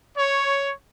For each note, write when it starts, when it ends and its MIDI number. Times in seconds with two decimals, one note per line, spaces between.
0.17 0.73 73